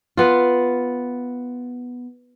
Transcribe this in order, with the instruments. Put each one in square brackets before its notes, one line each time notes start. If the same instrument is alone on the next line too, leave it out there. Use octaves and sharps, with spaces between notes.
[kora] B3 F4